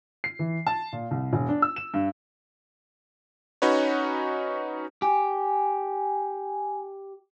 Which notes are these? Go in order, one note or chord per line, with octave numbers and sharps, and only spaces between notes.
C7
E3
A5
A#2
C2
E1
D4
E6
E7
G2
C#4 D#4 F#4 B4 C#5
G4 G#5